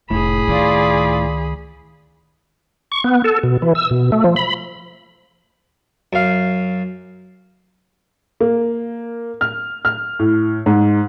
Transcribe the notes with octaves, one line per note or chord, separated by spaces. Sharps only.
F1 A2 G#4 B5
C#2 D#3 F4 D5
C#6
B3
A4
B2
E3
E6
B2
A3
F3
B5
F#2 F5
A#3
F6
F6
A2
G#2